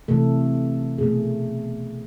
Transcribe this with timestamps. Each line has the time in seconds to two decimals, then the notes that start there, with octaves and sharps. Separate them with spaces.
0.08 C3 E3 A3 A4
0.98 B2 A3 G#4